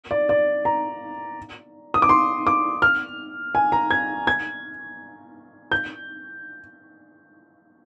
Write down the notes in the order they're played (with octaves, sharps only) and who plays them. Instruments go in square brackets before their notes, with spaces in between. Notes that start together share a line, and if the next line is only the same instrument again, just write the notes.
[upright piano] D5
D5
A#5
D#6
D6
C6
D6
F6
G#5
A#5
G#6
G#6
G6